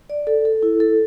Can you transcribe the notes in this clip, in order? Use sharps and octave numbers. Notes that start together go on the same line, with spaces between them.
D5
A4
A4
E4
A4